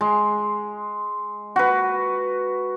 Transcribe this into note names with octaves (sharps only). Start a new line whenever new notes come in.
G#3
F#4 B4